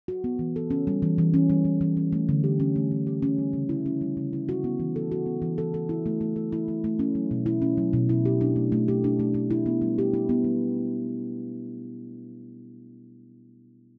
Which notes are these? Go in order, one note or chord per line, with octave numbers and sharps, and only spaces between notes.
F#4
B3
E3
A4
C#4
G3
E3
E3
C#4
G3
E3
E3
C#4
A3
D3
G4
C#4
A3
D3
G4
C#4
G3
C#3
E4
C#4
G3
C#3
E4
F#4
B3
E3
A4
F#4
B3
E3
A4
A4
E4
A3
A3
A4
E4
A3
A3
C#4
F#3
B2
E4
C#4
F#3
B2
E4
G4
D4
A3
A3
G4
D4
A3
A3
E4
B3
G3
G4
E4
B3
G3